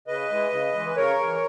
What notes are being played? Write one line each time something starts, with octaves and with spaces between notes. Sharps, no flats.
C#3 B4 D#5
E3 G#3
C#3
E3 G#3
B4
C#3 A#4 C#5
E3 G#3